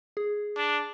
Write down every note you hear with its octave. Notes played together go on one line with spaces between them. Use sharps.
G#4
D4